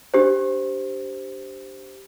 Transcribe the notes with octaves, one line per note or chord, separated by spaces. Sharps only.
D4 G4 C5